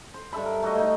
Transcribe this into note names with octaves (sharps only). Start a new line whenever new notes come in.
C5
G2 A4 E5 B5
A#4
A3 F#4 D#5
A2 D#4